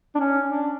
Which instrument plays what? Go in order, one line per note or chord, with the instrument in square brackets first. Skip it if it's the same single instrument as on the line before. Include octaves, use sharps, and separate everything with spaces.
[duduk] D4
C#4
D4